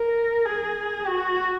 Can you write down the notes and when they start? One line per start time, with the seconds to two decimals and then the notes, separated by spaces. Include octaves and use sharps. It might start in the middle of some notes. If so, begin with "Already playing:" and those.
Already playing: A#4
0.46 G#4
1.07 F#4